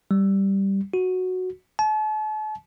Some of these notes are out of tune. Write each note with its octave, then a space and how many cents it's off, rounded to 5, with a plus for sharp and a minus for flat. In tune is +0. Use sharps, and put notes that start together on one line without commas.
G3 -5
F#4 -5
A5 -40